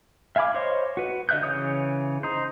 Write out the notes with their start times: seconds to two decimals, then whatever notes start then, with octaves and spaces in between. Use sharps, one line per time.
0.36 E5 F5 G#5 B5 D6
0.54 C5 C#5 D#5
0.97 F#4 B4
1.29 D3 D#5 E5 F#6 G6
1.43 C#3 E3 C#5 D#6 G6
2.23 D#4 C5